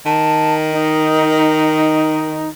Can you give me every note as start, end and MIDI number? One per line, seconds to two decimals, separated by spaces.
0.06 2.51 51
0.06 0.54 81
0.72 2.49 63